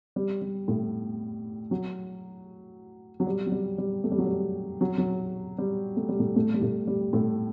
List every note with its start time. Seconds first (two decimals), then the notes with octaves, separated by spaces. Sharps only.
0.16 G3
0.41 G3
0.68 A2 A3
1.71 F#3
3.20 F#3
3.27 G3
3.46 F#3
3.52 G3
3.78 G3
4.04 A3
4.12 G3
4.18 F#3
4.27 G3
4.81 F#3
4.98 F#3
5.58 G3
5.97 A3
6.09 G3
6.19 A2 A3
6.36 A2 A3
6.54 G3
6.61 A2 A3
6.87 G3
7.13 A2 A3